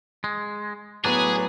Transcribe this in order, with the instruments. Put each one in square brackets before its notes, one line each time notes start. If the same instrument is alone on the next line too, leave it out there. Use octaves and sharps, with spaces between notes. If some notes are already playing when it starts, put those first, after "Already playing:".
[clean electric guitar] G#3
[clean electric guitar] A2 F#3 D4 [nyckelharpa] B3 B4 [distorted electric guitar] G#4